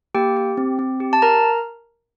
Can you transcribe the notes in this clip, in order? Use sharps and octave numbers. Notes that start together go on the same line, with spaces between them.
A#3 G4 G5
G4
C4
C4
G4
A5
A#4 A#5